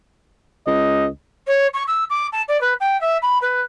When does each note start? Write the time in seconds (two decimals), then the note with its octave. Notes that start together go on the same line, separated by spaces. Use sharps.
0.67 C#2 D#5
1.47 C#5
1.74 C#6
1.88 E6
2.10 D6
2.32 A5
2.48 D5
2.61 B4
2.80 G5
3.01 E5
3.22 B5
3.42 B4